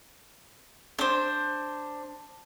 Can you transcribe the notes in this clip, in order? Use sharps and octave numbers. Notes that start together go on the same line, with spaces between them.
D4 C5